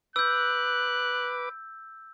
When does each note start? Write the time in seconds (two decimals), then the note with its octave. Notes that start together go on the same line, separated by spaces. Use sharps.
0.16 B4 D6 E6 F#6 G6